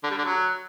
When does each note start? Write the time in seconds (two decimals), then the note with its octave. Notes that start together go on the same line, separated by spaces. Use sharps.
0.04 D3
0.11 G3
0.18 D3
0.25 F#3